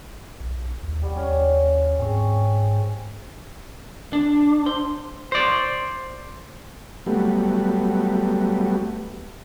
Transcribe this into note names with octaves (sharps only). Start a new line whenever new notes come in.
B1
D#2
G3 F#4
D#2 C#4
G#2 C4 G#4 C#5
D4
C5
C5 D5
F#3 G3 A3 B3